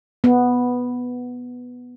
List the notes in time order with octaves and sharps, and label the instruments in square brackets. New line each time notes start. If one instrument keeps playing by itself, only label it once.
[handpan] B3